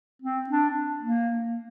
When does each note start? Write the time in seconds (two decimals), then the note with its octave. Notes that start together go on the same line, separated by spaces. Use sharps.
0.22 C4
0.49 D4
1.02 A#3